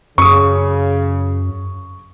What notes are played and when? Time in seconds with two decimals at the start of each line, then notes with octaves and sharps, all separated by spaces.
0.18 F#2 C#3 C#6 D#6